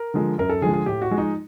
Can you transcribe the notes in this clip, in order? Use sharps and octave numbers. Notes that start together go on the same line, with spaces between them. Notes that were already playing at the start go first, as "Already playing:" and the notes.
Already playing: A#4
D3 F3 G#3
F#2 A#4
A4
D3 F3 G#3 G#4
G#4
A2 G4
F#4
F3 G#3
D#4